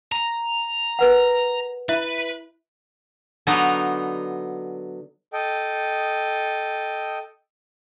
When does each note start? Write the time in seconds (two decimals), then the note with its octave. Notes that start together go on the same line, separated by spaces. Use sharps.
0.12 A#5
0.99 A#4 B4 F#5
1.89 E4 B4 E5
3.47 D3 F#3 B3 D#4 A#5
5.33 A4 D#5 G5